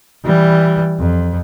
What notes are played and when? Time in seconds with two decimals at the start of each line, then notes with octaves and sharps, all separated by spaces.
0.25 E3 G3
0.99 F2